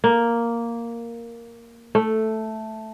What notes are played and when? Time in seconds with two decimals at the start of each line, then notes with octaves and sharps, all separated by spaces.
0.04 A#3
1.95 A3